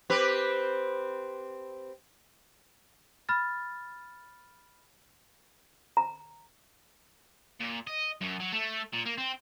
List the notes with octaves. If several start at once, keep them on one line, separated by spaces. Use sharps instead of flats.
C4 G4 B4
B5 F6 A6
A#5
A#2
D#5
F#2
F#3
A3
A#2
A#3
C4